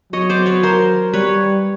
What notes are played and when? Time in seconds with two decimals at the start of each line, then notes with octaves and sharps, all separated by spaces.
0.13 F#3 C#5 D#5
0.30 C5 D5
0.46 B4 C#5
0.63 A#4 C5
1.13 G3 B4 C#5